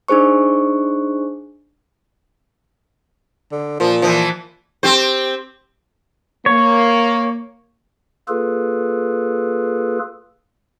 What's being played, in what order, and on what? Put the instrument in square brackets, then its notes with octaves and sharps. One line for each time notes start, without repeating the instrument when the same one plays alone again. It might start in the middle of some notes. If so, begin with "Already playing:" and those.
[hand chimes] D4 D#4 G#4 C5 C#6
[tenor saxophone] D3
[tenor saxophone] A#2 [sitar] F3
[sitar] E3 F3
C4 G4 C5
[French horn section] A#3 [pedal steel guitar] C#5
[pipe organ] A#3 F4 G#4 A4 B4